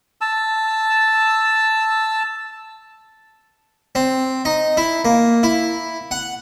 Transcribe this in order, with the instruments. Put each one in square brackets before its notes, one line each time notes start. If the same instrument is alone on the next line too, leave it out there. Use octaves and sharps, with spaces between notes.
[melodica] A5 E6
[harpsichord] C4
D#4
E4
A#3
E4
F#5